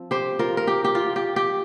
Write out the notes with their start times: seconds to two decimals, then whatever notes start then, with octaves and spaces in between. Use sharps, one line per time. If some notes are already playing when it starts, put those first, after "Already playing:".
Already playing: F3 C4
0.11 G4 C5
0.39 F4 A#4
0.57 A#4
0.67 G4
0.84 G4
0.95 F4
1.16 G4
1.36 G4